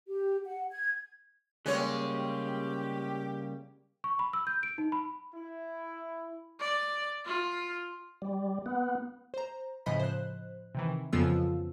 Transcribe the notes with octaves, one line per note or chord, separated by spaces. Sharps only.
G4
F#5
G#6
C#3 G3 G#3 A#3 G4 C#5
C#6
B5
E6
G6
D7
D#4
B5
E4
D5
F4
G3
B3
C5 A#5
A2 C#3 F3 D#5 B5 B6
C5 F#6
C3 D#3 E3
F2 C#3 F3 B3 F4 E6